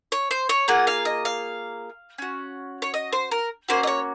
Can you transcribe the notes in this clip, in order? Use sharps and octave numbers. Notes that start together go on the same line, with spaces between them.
C#5
C5
C#5
A#3 F4 G#4 F#5
F5
D#5
F5
C#4 F#4
C#5
D#5
C5
A#4
A#3 C#4 F#4 C5
D#5
C#5